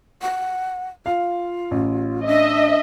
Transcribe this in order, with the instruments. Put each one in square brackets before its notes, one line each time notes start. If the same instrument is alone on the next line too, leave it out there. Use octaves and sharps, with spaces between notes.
[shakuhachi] F#5
[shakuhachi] F4 [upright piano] F5
[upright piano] A1
[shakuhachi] D4 [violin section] D#5 E5